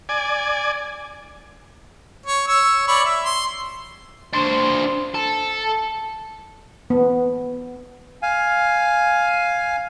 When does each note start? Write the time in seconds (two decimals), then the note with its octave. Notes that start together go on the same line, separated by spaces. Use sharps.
0.09 D5 G#5
2.26 C#5
2.48 C#5 E6
2.87 C#5 D5 B5
3.04 E5
3.25 C6
4.33 D4 C5
5.14 A4
6.90 B3
8.22 F5 G#5